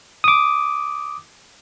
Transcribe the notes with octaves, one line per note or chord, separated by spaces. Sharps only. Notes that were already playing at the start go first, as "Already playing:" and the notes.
D6 D#6